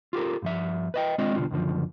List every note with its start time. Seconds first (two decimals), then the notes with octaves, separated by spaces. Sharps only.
0.13 F4 G4 A4 A#4
0.42 G2 F3 E5
0.94 B4 D#5 G5
1.18 G#3 C4 D4 F4 D#5
1.36 C2 G#2 B2 D3 F4
1.50 C#2 F#2 D3 F3